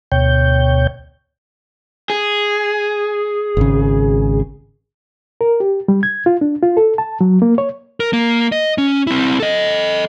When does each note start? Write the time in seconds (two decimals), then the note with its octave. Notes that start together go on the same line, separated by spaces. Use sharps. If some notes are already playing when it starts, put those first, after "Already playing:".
0.12 D2 B2 C#5 G5 G6
2.10 G#4
3.57 G#1 C#3
5.41 A#4
5.60 G4
5.88 G3
6.03 G#6
6.26 F4
6.41 D4
6.63 F4
6.77 A4
6.98 A5
7.21 F#3
7.42 A#3
7.58 C#5
8.00 A#4
8.13 A#3
8.52 D#5
8.78 C#4
9.07 C4 E4
9.40 A4 D#5